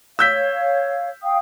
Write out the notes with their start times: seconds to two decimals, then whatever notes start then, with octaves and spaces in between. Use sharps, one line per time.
0.19 C#5 F5 E6 G6 B6
1.23 F5 G5 D#6